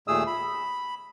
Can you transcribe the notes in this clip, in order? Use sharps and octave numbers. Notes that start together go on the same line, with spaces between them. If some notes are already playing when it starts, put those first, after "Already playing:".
D#2 A#2 A3 G#4 D#6 E6
B5